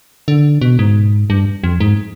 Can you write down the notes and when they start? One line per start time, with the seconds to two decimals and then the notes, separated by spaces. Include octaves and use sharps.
0.28 D3
0.61 B2
0.79 G#2
1.30 G2
1.64 F2
1.80 G#2